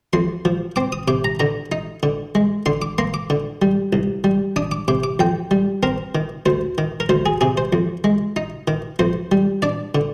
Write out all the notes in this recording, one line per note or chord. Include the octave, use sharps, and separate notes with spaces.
F2 C6
F3
C4 D6
D#6
C3 D6
A#5
D3 A#5
D#4
D3
G#3
D3 C6
D6
A#3 C6
D6
D3
G3
C2
G3
D4 D#6
D6
C3 D6
D6
F2 G5
G3
C4 A#4
D#3
D2 C5
D#3
A#4
D2 C5
G#4
C3 G#4
C5
F2
G#3
D#4
D#3
F2 C5
G3
D4 D5
D3